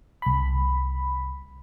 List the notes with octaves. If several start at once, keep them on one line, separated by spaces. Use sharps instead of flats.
C2 B5